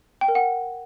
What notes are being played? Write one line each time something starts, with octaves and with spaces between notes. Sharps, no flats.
G5
A#4
F#5